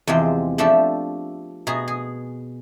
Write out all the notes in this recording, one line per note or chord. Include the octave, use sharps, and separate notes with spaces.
E2 C3 F3 G#3 C4
F3 A3 D4 G4 A4
B2 G#4 A#5
G#4